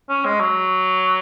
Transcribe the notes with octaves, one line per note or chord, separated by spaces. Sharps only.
C#4
G#3
F#3